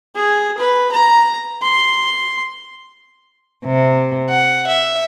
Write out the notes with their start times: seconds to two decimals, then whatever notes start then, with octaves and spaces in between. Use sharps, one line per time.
0.15 G#4
0.58 B4
0.92 A#5
1.61 C6
3.66 C3
4.30 F#5
4.67 E5